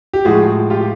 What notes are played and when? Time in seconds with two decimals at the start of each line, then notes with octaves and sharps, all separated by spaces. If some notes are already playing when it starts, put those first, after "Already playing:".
0.13 G4
0.25 A2 F3 G#3 F#4 G#4
0.70 F4 G4